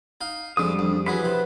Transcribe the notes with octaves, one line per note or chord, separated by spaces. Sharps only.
D#4 F5
F2 G3 G#3 D4 D#6
F2
E3 F#3 G#4 B4 E5 B5
C3 C4